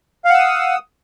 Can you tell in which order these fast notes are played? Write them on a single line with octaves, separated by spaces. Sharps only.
F5 F#5 E6 D#6